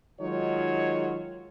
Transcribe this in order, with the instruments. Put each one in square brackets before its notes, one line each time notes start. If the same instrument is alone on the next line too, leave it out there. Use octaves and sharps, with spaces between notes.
[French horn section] D#3 F#3 G#3 D#4 F4 C#5